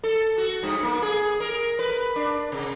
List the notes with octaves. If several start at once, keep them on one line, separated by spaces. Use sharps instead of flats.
A4
F#4
G2
A#3
G#4
A#4
B4
D4
C3